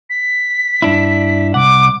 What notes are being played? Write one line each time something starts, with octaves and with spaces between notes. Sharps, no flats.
B6
G2 D4 E4
C2 F#5 D6